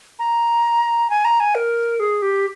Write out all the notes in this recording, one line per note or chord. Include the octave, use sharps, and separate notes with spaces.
A#5
G#5
A#5
G#5
A#4
G#4
G4